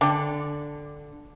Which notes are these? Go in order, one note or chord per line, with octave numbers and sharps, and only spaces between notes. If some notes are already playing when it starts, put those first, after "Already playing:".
D3 D4 G5